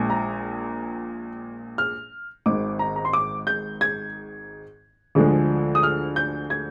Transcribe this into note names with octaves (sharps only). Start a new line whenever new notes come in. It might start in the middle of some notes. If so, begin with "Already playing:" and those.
Already playing: A#1 A#2 G#3
A#5
F6
G#1 G#2 D#3 D6
A#5
A#5
C6
D6
G6
G#6
D2 D3 F3 G#3
D#6
F6
G6
G#6